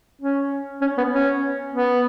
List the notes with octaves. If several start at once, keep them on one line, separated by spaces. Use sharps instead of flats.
C#4
C#4
B3
C#4
B3